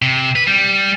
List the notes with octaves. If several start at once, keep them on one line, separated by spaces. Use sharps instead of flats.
C3
B4
G3